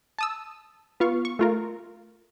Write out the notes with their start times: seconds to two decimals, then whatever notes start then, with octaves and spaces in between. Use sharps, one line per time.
0.19 A5 D#6 E6
1.00 B3 F4 F5 C#6
1.25 C#6
1.39 A3 F4 A#4